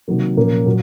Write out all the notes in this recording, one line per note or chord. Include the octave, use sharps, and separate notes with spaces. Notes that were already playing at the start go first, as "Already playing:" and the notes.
C3 D#3 F#3 A#3
A#2 F3 A#3 C#4
A#2 F#3